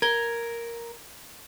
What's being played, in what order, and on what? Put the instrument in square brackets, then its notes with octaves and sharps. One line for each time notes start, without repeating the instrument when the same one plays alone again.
[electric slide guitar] A#4 [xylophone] G#6 G7